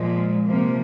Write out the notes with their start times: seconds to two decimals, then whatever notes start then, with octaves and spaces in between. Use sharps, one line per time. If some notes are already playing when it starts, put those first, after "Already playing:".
Already playing: A#2 F3 G#3
0.45 C3 F3 A#3